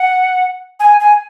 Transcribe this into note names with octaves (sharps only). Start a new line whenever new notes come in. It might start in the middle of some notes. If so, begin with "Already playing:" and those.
Already playing: F#5
G#5
G#5